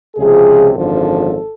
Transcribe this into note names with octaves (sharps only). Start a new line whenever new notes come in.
C#2 C3 F3 G#4
G#1 F#2 D3 F3 A4